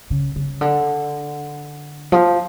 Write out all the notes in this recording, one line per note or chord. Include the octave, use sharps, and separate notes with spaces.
C#3
C#3
D3
F3